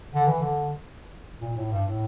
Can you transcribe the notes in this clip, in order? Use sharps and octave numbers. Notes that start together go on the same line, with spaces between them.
D3
E3
D3
A#2
A2
G2
A2